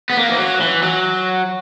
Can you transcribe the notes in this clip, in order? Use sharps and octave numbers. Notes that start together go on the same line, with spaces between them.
B3
A#3
E3
F#3
E3
F#3